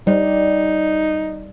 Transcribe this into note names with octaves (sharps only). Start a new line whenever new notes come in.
G3 D#4